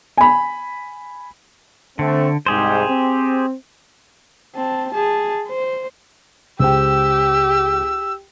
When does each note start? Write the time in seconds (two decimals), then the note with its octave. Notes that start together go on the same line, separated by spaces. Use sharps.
0.17 G#5 B5
1.99 D3 A3 C4
2.46 C2 G#2 G4 G#4 C5
2.90 C4
4.56 C4 A5
4.92 G#4 A5
5.47 C5
6.60 C#2 G4 C5 G5 E6